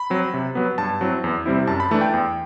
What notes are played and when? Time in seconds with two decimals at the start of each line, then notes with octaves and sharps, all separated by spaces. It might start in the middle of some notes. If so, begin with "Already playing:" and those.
Already playing: B5
0.10 F#3 C4
0.34 C3
0.55 F#3 B3
0.78 G2 A5
1.01 F#3 C4 E4
1.24 E2
1.46 C3 G3 C4 E4
1.67 F#2 A5
1.80 B5
1.91 E3 A3 D4 A5
2.01 G5
2.14 E2